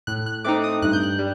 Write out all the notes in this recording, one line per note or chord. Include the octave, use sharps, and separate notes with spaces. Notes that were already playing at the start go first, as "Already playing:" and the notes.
A2 F#6
F#6
A3 C4 D#4 D6
D#6
G2 F#6
G6
F#6
G3